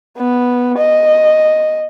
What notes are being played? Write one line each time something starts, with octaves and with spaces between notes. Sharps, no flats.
B3
D#5